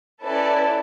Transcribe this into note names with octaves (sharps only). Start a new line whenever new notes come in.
C#4 E4 A4 B4 D5 A5